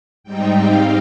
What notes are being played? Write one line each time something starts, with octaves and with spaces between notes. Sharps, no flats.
G#2 G3 C4 D#4 G5
F5